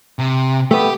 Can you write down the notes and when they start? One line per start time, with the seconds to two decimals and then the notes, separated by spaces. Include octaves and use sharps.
0.19 C3
0.71 A3 B3 G4